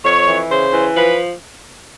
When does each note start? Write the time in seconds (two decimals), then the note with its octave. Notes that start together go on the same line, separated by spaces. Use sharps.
0.03 F2 C#5
0.27 E3
0.50 C#3 C5
0.73 E3
0.96 F3 B4